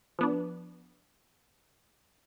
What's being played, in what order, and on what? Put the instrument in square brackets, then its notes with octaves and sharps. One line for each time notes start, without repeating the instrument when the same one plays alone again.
[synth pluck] F3 B3 D4